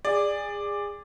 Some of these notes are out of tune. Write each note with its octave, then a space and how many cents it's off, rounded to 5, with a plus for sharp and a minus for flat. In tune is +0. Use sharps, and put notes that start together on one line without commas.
G#4 -25 D5 +5